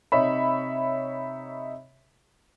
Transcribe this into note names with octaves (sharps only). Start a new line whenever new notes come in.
C3 D#4 C#5 E5 B5